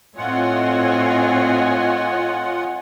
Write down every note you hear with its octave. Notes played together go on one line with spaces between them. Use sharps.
A2 C4 F4 C#5 D#5 F#5 G#5